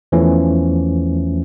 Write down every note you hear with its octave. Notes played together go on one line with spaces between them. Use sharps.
E2 E3 F3 A3 C#4